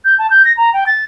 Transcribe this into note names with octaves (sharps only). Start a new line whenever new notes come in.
G6
A5
G6
A#6
A#5
G5
A6